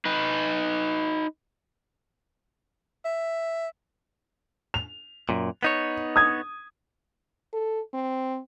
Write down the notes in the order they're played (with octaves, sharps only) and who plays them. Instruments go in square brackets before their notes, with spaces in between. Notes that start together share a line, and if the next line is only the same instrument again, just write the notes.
[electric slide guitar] D#4 B4
[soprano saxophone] E5
[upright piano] F7
[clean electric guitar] F#2 A#2
B3 D#4 C#5
[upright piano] D#6 G#6
[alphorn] A4
C4